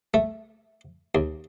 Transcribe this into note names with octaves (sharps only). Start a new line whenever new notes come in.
A3
D#2